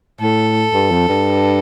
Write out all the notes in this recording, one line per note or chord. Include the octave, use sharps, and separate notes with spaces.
A2 A4
G2
F2
G2